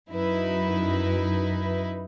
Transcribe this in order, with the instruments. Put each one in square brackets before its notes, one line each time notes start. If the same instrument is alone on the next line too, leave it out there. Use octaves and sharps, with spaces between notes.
[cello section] F#2 [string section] D#4 E4 B4